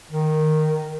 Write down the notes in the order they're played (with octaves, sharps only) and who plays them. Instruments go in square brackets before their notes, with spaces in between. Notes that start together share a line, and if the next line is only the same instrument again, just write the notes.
[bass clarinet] D#3